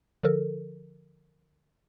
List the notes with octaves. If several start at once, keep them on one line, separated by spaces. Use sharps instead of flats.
D3 F3 A4 A#4